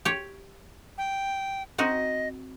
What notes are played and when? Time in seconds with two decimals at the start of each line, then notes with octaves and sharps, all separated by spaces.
0.05 G4 C#5
0.98 G5
1.78 C4 D#4 F#4 D#5